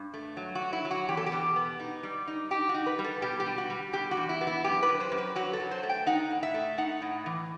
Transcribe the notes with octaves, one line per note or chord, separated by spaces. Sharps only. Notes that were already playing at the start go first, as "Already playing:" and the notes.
Already playing: G2
A3
F#3
F#4
F#3
E4
F#3
F#4
E2 G4
A4
G4
B2
B3
D#4
G3
D#4
D#4 G4
F#4
D#4
B4
G3
A4
B2 G4
G4
G3
F#4
G3
B2 G4
F#4
E2
E4
B3
E4
F#2 G4
B4
F#2
C5
F#2
B4
F#3 F#4
A4
F#3
C5
A3
G5
D#4 F#5
A2
E5
A3
D#4 F#5
A2
E3